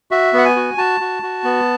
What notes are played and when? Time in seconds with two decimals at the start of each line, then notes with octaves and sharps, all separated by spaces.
0.11 F#4 E5
0.33 B3 F#5
0.45 G#5
0.56 F#4
0.78 F#4 A5
1.01 F#4
1.23 F#4
1.44 B3